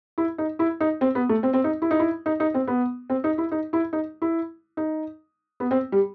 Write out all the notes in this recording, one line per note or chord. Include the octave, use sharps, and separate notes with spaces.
E4
D#4
E4
D#4
C4
B3
A3
C4
C4
D#4
E4
D#4
E4
D#4
D#4
C4
B3
C4
D#4
E4
D#4
E4
D#4
E4
D#4
B3
C4
G3